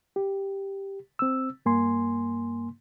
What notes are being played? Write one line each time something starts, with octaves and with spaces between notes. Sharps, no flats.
G4
C4 E6
G2 A#3 G#5 C6